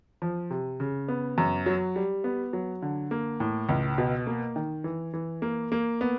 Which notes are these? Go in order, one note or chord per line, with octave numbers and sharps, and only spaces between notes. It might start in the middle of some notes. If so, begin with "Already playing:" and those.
F3
C3
C#3
B3
F#2
F#3
G3
B3
F#3
D3
A#3
A2
C#2
B2
A#3
D#3
E3
E3
A#3
A#3
B3